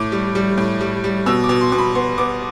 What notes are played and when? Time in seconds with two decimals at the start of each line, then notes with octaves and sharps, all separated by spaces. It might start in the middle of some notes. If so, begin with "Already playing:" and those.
Already playing: A2 D6
0.12 G3
0.35 G3
0.58 A2
0.81 G3
1.04 G3
1.26 B2 E6
1.44 D6
1.49 B2
1.61 C6
1.72 B2
1.78 B5
1.95 B3 C6
2.18 B3 D6